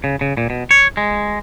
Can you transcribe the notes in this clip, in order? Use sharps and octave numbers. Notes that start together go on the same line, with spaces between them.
C#3
C#3
A#2
B2
C#5
G#3